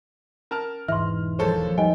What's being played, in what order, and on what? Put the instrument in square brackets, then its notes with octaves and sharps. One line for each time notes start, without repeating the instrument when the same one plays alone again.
[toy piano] C#4 [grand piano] A#4 A5 F6
[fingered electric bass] E1 E3 [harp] G#2 [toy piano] E5 C6 [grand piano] F6
[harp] D#2 F3 A5 [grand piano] G#3 A4 C5 [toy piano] G4 C#5
[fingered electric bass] G3 [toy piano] D#4 D#5 G#5 [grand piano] G5